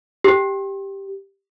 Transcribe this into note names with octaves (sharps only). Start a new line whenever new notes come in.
G4